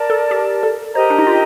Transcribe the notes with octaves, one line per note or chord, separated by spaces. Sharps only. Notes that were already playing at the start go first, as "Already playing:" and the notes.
Already playing: A#4 D5 A5
A4
G4
A4
G4 A#4 C5 D#5 A#5
D4
D#4
F4